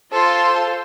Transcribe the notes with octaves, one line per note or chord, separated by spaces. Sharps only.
F4 A4 C5 C6